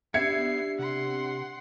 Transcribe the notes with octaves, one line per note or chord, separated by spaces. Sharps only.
B3 D4 G4 D5 E5 G#6 C7 C#7
C3 F#5 C6